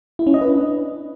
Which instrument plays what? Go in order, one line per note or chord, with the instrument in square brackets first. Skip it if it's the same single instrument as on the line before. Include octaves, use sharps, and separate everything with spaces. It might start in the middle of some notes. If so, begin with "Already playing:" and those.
[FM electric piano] E4
C#4
D#5
B4
D4